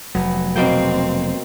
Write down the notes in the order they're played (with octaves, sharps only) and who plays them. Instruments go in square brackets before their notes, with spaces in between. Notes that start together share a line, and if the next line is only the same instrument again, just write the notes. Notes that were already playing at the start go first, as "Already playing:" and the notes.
[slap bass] F1 F#3 [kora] B3
[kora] B2 A#3 G5 [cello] C4